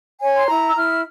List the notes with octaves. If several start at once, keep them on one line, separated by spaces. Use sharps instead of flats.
C#5 G#5
C6
E4 A#5
E6
E4 F6